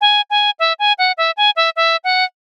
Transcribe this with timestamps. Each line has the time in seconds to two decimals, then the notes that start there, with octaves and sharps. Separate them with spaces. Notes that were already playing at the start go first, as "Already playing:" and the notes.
0.01 G#5
0.30 G#5
0.59 E5
0.79 G#5
0.98 F#5
1.18 E5
1.37 G#5
1.56 E5
1.76 E5
2.04 F#5